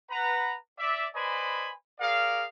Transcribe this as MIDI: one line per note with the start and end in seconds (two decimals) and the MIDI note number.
0.10 0.56 71
0.10 0.56 78
0.10 0.56 82
0.79 1.08 74
0.79 1.08 76
1.15 1.72 71
1.15 1.72 72
1.15 1.72 74
1.15 1.72 75
1.15 1.72 80
1.15 1.72 83
2.00 2.46 68
2.00 2.46 70
2.00 2.46 74
2.00 2.46 77